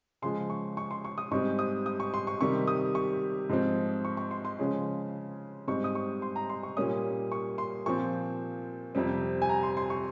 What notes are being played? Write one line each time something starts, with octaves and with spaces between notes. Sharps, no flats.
C#3 F3 G#3 C6
C#6
C#6
C6
C#6
D#6
G#2 G3 C4 C#6
D#6
D#6
C#6
C6
C#6
C3 D#3 G3 C#6
D#6
C#6
G#2 F3 C4
C#6
C#6
C6
C6
C#3 F3 G#3 C#4
G#2 G3 C4 C#6
D#6
C#6
C6
A#5
C6
C#6
A#2 G3 A#3 C#4 D#6
C#6
C6
A#2 F3 C4 C#6
F2 C3 G3 C4
G#5
A#5
C6
C6
C#6